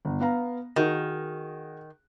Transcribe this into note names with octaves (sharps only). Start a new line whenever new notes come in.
G1
B3 F5 A#5
D#3 F#4 G#4